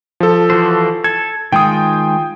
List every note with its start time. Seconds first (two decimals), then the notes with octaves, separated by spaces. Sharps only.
0.20 F3 A4
0.50 E3 F#4 C5
1.04 A4 G#6
1.52 D#3 G#3 F4 G5 D#6